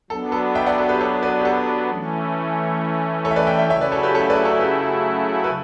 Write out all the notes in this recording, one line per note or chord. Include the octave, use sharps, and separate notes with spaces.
F#3 B3 D4 A4
A4
E5 G5
D5 F#5
A4
G4 B4
A4 C#5
B4 D5
G4
A4
E3 A3 C#4
A4 C#5
E5
B4 D5
E5 G5
E5 G5
C#3 F#3 A3 E4 C#5 E5
B4 D5
A4 C#5
G4 B4
A4 C#5
B4 D5
A4 C#5
G4 B4
B4